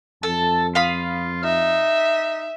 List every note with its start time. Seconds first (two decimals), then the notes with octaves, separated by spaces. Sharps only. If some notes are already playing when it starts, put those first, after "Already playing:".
0.23 F2 A4 A5
0.75 F4 F5 B5 D#6
1.44 D#4 E5